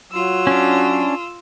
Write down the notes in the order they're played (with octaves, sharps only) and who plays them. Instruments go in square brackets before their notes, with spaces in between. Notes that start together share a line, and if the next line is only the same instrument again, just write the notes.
[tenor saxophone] F#3 [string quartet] F4 E6
[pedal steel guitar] C#4 D4